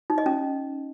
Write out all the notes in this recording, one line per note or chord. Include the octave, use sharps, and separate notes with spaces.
D#4
D#5
C#4